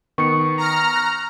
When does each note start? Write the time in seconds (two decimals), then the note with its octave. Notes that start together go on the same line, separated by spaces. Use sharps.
0.18 D#3 B3 C#6 C#7
0.58 A#5 F6
0.96 F#6